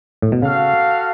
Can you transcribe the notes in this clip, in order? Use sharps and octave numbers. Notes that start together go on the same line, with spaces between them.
A2
B2
C#3 F#4 A4 F5